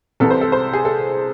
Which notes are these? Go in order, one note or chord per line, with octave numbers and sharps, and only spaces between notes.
C2 C3 E3 A4
C5
A4
C5
G#4
A4